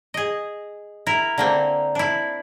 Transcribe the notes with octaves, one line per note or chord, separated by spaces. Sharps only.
G#4 D#5
E4 A#4
D3 A#3 C4
D4 E4